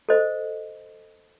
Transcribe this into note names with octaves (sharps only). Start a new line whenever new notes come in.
A4 C5 D#5